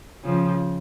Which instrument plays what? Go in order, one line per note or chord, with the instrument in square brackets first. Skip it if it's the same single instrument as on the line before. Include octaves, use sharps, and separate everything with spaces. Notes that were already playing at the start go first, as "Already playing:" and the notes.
[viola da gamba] C#3 F3